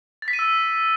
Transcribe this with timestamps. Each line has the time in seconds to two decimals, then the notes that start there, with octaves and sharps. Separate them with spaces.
0.22 A6
0.28 B6
0.33 D#7
0.39 E6